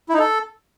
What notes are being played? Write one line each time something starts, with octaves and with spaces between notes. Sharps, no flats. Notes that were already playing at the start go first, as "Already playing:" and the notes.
E4
D#4
A4